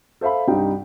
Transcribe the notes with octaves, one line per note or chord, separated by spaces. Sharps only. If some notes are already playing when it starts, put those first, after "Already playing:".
A4 C5 E5 F5 B5
C2 G2 G3 D#4 G5